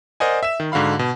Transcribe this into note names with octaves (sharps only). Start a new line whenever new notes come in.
A#4 C5 D5 D#5 F#5 G#5
E5 E7
D#3
G#2 D3 F#4 F5 B5
B2